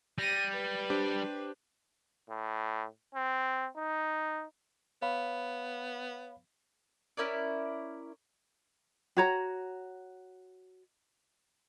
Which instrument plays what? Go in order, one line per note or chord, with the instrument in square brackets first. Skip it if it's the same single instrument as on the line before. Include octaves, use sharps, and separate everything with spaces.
[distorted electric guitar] G3 [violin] A#6 D#7
[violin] B4
[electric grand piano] D4 G4 C5
[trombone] A2
C4
D#4
[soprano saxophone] B3 [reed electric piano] C#5 F5 B5
[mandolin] C#4 E4 A#4 D5
[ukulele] F#4 C#5 A#5